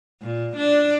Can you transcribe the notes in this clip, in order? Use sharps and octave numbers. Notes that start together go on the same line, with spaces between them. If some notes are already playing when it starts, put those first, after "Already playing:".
A#2
D4